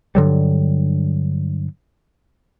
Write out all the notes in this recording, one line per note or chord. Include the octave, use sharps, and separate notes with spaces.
G2 D3 F#3 G3